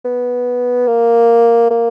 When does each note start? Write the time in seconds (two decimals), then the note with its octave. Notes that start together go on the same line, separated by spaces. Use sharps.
0.05 B3
0.87 A#3
1.70 A#3